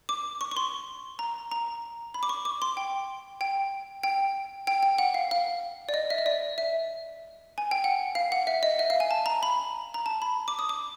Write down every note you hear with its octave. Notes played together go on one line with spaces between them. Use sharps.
D6
C#6
C#6
C6
A#5
A#5
B5
D6
C#6
D6
C6
G5
G5
G5
G5
G5
F#5
F5
F5
D5
D#5
E5
D#5
D5
E5
G#5
G5
F#5
F5
F#5
E5
D#5
E5
F5
G#5
A5
A#5
B5
A#5
A5
B5
D6
D#6
D6